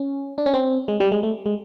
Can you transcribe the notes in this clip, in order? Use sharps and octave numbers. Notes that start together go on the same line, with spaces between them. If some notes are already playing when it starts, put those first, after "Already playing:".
Already playing: C#4
D4
C#4
C4
G#3
G3
G#3
A3
G#3